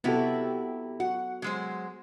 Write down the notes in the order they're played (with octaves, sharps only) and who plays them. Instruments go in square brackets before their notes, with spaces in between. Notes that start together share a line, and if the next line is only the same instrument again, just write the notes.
[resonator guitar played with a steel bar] C3 E4 G4 [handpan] B3 F#4 A4
[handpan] F#4 [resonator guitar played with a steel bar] F#5
[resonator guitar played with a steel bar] F#3 G#3 C5